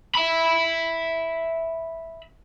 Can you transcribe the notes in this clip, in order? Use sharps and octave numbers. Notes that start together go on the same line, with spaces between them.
E5 B5